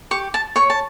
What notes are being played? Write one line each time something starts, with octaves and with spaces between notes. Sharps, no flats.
G4 C#6
A5
C#5 C#6
A5